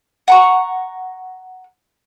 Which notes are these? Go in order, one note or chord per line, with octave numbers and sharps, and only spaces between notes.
F#5 A#5 C#6